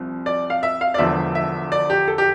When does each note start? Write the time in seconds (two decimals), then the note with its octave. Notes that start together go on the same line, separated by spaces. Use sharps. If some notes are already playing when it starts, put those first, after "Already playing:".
Already playing: C2 C3 F3
0.26 D5
0.50 F5
0.63 E5
0.81 F5
0.94 D5
0.98 E1 E2 D3 F3 E5
1.35 E5
1.72 D5
1.90 G4
2.08 A4
2.18 G4